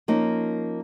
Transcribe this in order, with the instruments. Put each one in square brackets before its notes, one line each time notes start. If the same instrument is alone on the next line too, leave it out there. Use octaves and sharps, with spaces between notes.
[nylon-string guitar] F3 A#3 C#4 D#4